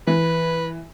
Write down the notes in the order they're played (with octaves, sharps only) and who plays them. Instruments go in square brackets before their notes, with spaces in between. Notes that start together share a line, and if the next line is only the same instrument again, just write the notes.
[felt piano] E3 [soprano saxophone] B4